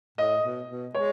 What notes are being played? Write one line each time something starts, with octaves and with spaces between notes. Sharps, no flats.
A2 D#5
B2
B2
G#3 C#5